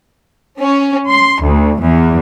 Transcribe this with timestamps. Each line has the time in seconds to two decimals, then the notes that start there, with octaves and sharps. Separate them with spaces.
0.60 C#4
1.09 C6
1.42 D2
1.81 E2